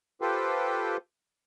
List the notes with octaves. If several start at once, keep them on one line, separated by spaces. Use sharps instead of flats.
F4 G4 A4 B4 C5 G5